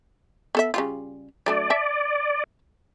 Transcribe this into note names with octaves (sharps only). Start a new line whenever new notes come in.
B3 A4 E5
C#3 G3 F4
F#3 A3 D4 D5
E5 A5